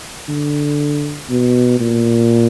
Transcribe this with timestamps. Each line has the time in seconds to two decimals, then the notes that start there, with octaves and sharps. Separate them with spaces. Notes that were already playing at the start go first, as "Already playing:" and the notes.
0.28 D3
1.30 B2
1.80 A#2